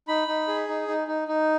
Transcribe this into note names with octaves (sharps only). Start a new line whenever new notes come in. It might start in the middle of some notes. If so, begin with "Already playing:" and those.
D#4 B5
D#4
G#4
D#4
D#4
D#4
D#4